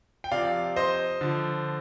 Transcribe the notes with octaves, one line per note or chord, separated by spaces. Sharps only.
G5
C3 F3 D5 F5
C5 D#5
D3 F3